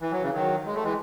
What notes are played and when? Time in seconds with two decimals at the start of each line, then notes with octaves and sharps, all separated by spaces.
0.01 E3
0.12 F#3
0.22 C#3 E3
0.33 D#3 F#3
0.66 G#3
0.74 A3
0.84 E3 G#3